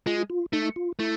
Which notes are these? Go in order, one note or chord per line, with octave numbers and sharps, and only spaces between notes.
G#3 F4
F4
A3 D#4
F4
A3 E4